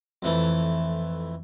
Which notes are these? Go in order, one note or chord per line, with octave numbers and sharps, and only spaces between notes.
F2 E3 A3